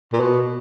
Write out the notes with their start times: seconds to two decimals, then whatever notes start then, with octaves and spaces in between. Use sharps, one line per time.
0.13 A#2
0.20 B2